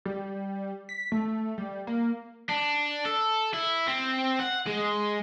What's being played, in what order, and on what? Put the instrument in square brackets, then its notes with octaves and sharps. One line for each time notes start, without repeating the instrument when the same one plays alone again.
[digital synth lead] G3
B6
A3
G3
A#3
[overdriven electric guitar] D4
A4
E4
C4
F#5
G#3